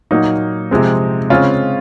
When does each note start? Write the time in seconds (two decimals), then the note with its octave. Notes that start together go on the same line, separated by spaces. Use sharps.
0.11 A#2 F#3 A#3 D#4
0.71 C3 F3 G#3 C4
1.30 C#3 G#3 C4 C#4 F4